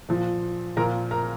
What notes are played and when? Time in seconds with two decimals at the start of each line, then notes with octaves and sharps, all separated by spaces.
0.09 A#2 F3
0.77 A#2 F3 A#4 A#5
1.11 A#4 A#5